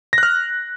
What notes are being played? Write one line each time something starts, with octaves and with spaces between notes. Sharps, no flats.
F6 F#6 A#6